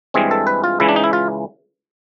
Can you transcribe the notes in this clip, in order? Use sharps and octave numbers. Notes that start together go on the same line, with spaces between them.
G2 E3 G#3 C4 G#4
A4
B4
F4
C#2 C#3 E3 E4
D4
D#4
E4
F4